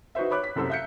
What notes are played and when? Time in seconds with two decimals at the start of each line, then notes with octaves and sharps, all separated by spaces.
0.15 D#4 F#4 B4 C5 E5
0.31 C#5 B5 D6 F#6
0.43 B6
0.56 C2 F#2 A4 C5 E6
0.70 E5 F5 G6 B6 C#7